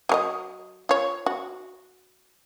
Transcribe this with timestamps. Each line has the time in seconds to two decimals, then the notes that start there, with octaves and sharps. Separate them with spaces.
0.09 F#3 A#4 D#5
0.89 F4 C#5
1.26 F#4